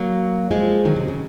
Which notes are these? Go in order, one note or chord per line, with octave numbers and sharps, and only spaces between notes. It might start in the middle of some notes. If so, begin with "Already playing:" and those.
Already playing: F#3 A#3
F3 G#3
D#3 F#3
C3
C#3